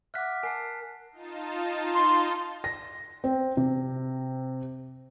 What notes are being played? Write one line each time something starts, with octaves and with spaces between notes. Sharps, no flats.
E5 F#5 D6 F6 F#6 B6
A#4 G#5 A5 C7
D#4 F4 A5
C6
A#6
C4
C3